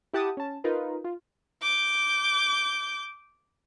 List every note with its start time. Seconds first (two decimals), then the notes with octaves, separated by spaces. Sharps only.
0.13 E4 G4 F#5 A5 D6 D#6
0.37 C#4 A5
0.64 D#4 F4 A#4 B4
1.04 F4
1.62 D6 G6